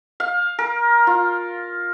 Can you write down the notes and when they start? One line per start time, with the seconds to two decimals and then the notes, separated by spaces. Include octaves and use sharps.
0.20 F5
0.59 A#4
1.07 F4